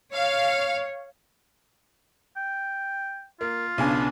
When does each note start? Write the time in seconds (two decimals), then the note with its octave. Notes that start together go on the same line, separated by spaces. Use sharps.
0.14 C#5 F5
2.37 G5
3.41 A#3 F4
3.78 B1 C#3 B3 D4 G#5